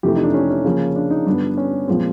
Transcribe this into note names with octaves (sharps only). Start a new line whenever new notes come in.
F2 C3 E3 A3 G4
D#4
D4
C#4
C#4
C#3 F3 A#3
D4
D#4
G2 D3 G3 B3 D4
C#4
A#2 F3 G#3 B3 C4